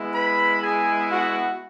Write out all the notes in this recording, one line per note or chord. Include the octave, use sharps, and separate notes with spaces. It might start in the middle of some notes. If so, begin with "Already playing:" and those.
Already playing: G#3 B3 E4
B4 B5
G#4 G#5
F#4 F#5